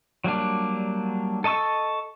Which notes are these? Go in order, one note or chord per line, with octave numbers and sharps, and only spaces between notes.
F#3 G3 A#3 D4
A4 D#5 A5 C#6 E6